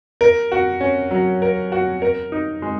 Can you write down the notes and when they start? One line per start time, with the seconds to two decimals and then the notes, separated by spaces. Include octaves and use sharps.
0.21 A#4
0.52 F#4
0.81 C#4
1.11 F#3
1.42 A#4
1.72 F#4
2.02 A#4
2.32 D#4
2.62 G#3